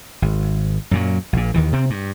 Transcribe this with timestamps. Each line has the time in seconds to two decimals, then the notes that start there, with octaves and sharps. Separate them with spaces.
0.22 G#1
0.91 F#2 A#2 F#3
1.33 A#1 A#2
1.54 D#2 D#3 E3
1.73 C3 C4
1.90 G2